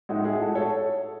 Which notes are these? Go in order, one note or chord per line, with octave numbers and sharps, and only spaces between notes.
A2 G#3 D#4 F#4
E4 G#4
F#4 A4
A4 C#5